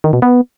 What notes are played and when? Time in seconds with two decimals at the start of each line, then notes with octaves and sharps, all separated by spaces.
0.04 D#3
0.13 B2
0.22 B3